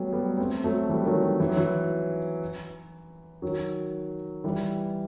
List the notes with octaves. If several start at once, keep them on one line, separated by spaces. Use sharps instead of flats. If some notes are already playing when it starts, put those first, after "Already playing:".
Already playing: F#3 G3 A3 B3
G3 B3
A3 C4
F#3 A3
E3 G3
D#3 F#3
E3
F#3
E3
D#3 F#3
E3 G3